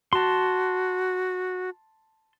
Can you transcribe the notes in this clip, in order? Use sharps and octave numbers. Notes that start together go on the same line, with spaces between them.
F#4 A5 C6